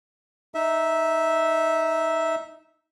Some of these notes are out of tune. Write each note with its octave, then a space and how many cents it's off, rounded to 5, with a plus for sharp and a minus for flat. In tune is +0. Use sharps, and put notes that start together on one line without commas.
D#4 +0 E5 -10